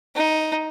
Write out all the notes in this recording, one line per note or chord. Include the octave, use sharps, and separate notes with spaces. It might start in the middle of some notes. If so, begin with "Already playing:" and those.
D#4